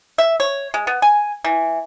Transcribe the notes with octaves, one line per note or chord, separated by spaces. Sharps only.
E5
C#5
G#3
B3
G#5
E3